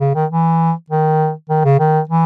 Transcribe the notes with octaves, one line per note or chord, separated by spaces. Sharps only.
C#3
D#3
E3
D#3
D#3
C#3
D#3
E3